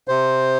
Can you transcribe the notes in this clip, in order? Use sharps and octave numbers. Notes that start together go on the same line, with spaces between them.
C3 C5